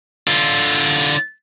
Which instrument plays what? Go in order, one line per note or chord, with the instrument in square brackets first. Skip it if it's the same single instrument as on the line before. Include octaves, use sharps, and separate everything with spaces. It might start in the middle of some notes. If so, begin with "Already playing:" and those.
[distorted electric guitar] D3 F4